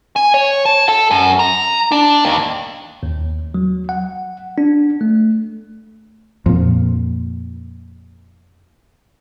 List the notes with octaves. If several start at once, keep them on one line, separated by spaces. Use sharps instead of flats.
G#5
C#5
A5
A4
F#2
A#5
D4
D#2
D#2
F#3
F#5
D4
A3
F2 A#2